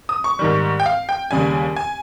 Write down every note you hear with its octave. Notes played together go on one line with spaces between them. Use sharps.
D#6
C#6
G#2 D#3 G3
G5
F5
G5
D#2 C#3 G3 G#5
G#5